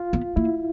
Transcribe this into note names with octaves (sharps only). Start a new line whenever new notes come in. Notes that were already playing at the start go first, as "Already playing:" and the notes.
Already playing: F4
B3
A#3 E4